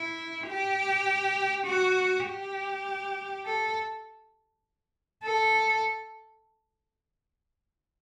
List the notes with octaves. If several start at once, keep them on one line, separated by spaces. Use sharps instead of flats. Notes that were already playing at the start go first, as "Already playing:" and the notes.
Already playing: E4
G4
F#4
G4
A4
A4